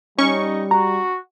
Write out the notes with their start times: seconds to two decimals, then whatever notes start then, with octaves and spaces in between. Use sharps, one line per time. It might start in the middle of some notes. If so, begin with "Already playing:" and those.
0.18 G3 C#4 D#4 C#6
0.71 F#4 A#5